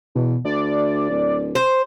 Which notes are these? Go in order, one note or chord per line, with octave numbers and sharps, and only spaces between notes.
E2 B2
D2 D5
D1
C5